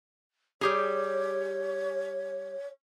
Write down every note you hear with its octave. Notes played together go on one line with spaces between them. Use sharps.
G3 G4 G#4 C#5